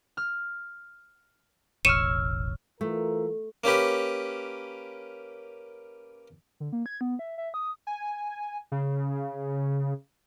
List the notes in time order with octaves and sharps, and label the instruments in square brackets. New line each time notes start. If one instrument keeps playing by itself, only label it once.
[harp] F6
[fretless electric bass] E1 A1 [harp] C#5 E6 F6 [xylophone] C#7 D#7 E7
[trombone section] E3 F4 A#4 [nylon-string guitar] A3
[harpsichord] A#3 C#4 G4 B4
[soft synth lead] D3
A#3
G#6
B3
E5
E5
D#6
[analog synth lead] G#5
C#3